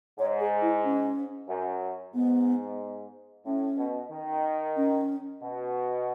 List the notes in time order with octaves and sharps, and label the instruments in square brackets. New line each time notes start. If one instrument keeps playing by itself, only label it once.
[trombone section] G#2 [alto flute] C#5
[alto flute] G#4
E4
C#4
[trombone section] F#2
[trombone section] G#2 [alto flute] B3
[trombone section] A2 [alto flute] C#4
[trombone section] B2
D#3
[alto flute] C#4
[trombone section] B2